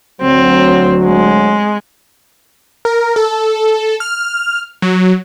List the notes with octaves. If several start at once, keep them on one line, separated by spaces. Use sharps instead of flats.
D2 F#3 C4
G#3
A#4
A4
F6
F#3